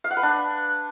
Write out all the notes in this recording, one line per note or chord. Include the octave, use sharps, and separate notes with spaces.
F5
F#5
B4
D4